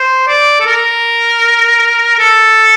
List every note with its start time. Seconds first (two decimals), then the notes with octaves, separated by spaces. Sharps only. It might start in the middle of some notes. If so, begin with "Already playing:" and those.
Already playing: C5
0.27 D5
0.60 A4
0.66 A#4
2.18 A4